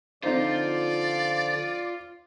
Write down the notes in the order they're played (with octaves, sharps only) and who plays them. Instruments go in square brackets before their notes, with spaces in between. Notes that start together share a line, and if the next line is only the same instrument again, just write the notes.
[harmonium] D3 F3 [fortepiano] C4 D#4 C5 [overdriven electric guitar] F4 [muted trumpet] D5